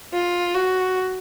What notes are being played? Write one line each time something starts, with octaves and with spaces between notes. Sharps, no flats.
F4
F#4